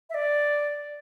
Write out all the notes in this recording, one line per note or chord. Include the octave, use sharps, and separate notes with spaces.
E5
D5